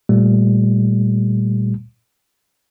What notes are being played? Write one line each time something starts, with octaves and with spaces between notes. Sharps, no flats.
A#2 G3 A3